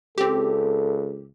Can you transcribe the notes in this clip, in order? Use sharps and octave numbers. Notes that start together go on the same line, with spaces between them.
C#2 C4 G4 A4